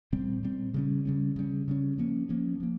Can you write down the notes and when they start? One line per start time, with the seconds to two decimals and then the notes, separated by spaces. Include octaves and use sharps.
0.12 A#2 G3 C4
0.43 A#2 G3 C4
0.74 C#3 G3 C#4
1.05 C#3 G3 C#4
1.36 C#3 G3 C#4
1.68 C#3 G3 C#4
1.98 F3 A#3 C#4
2.29 F3 A#3 C#4
2.60 F3 A#3